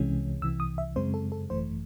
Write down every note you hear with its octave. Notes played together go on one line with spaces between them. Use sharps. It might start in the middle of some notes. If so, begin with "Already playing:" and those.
Already playing: C2 C3 E3 G#3 C#4
C2 C3 E3 E6
D#6
E5
F#2 C#3 G#3 C4 C5
A4
A4
G#1 F#2 E3 A3 C5